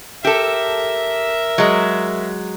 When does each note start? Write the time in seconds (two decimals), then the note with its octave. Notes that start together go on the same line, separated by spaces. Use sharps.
0.25 G4 A4 A#4 E5
1.58 F#3 G#3